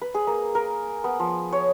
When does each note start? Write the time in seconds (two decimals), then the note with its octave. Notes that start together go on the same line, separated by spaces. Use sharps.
0.02 B4
0.15 G#4
0.27 A#3
0.55 A#4
1.04 B3
1.20 F3
1.52 C#5